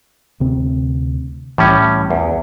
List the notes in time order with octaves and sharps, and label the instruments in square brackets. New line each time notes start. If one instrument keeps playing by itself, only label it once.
[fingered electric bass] D2 C3 C4
[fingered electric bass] C2 E3 [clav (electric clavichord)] A2 G3 C#4
[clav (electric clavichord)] E2